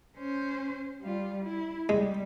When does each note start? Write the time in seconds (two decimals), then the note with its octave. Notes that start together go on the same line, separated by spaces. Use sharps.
0.17 C#4 C5
1.01 G3 F4
1.45 E4
1.89 G3 G#3